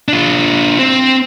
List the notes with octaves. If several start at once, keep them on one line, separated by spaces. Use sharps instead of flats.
D4 F4
C4